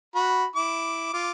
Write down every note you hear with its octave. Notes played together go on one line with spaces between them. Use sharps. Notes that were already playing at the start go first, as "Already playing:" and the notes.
F#4 B5
E4 D6
F4 D6